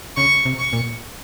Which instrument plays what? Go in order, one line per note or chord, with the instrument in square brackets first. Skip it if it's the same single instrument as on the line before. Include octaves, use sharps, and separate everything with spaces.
[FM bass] C#3 [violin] C#6
[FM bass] C3
[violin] C#6
[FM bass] A#2